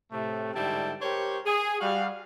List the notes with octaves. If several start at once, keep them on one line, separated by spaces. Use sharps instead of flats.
A2 C3 A3
G#2 D3 G3 E4 G5 A5
G4 A#4 C5 C#5
G#4
G3 F#4 F5